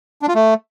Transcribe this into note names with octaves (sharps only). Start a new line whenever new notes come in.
D4
F4
A3